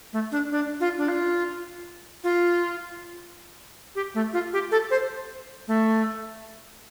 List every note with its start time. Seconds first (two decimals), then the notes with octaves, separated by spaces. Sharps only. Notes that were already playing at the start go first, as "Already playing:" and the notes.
0.13 A3
0.32 D4
0.51 D4
0.80 F4
0.98 D4
1.09 F4
2.24 F4
3.95 G4
4.15 A3
4.33 F4
4.53 G4
4.71 A4
4.91 C5
5.68 A3